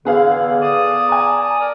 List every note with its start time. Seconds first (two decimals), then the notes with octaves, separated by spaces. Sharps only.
0.05 E2 A2 D3 B3 G#4 F5
0.61 D5 A5 D#6
1.09 G#5 A#5
1.59 A#4 D5